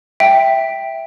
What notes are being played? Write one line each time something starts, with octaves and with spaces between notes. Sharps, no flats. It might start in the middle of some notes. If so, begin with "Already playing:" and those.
E5 G5